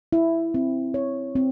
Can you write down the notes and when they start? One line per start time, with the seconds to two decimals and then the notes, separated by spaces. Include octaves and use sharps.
0.13 E4
0.54 C4
0.94 C#5
1.36 C4